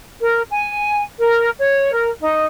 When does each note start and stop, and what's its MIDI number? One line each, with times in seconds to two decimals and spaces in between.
0.20 0.43 70
0.50 1.00 80
1.19 1.51 70
1.59 1.91 73
1.92 2.09 70
2.20 2.45 63